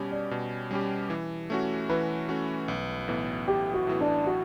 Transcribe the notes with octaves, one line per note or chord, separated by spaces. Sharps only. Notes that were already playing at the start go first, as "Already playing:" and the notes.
Already playing: B2 G3 C#4 G4
D5
B2
G3 C#4 G4
E3
A3 C#4 F#4
E3 B4
A3 C#4 F#4
B1
A2 E3 B3
B1 G4
F#4
A2 E3 B3
D4
F#4